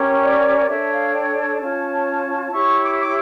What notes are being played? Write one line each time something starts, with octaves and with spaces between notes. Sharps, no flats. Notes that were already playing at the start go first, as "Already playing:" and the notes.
Already playing: C#4 G4 A#4 C#5
D5
D4 A4 C#5 E5
F5
G5
A5
C#4 F4 C#5
E4 G4 C#5 C#6
D6
D6